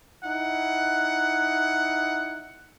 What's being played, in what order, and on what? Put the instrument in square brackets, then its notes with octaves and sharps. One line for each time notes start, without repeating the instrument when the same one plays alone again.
[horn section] D#4 E4 F#5